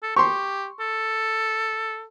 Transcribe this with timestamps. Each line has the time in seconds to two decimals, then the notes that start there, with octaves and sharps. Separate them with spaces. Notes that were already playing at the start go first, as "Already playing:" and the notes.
0.03 A4
0.16 G4 C6 C#6
0.80 A4